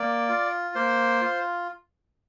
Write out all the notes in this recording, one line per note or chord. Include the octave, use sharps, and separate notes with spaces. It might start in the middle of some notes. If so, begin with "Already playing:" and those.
Already playing: A#3 D5
F4
A#3 C5
F4